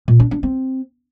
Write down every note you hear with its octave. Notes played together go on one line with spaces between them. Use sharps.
A#2
D4
D4
C4